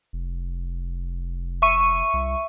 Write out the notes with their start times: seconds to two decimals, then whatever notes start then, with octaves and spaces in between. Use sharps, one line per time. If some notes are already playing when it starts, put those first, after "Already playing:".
0.13 F1
1.62 E5 C#6 D#7
2.14 C2